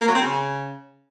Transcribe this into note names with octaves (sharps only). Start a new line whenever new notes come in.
A#3
F#3
C4
C#3